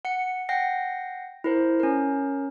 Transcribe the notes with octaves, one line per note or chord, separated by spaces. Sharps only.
F#5 C#7
F#5 G5 A#6 C7
E4 A#4 C5
C#4 A#4